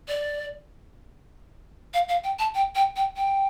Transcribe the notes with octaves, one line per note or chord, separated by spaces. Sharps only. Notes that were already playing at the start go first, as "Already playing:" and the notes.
D5
F5
F5
G5
A5
G5
G5
G5
G5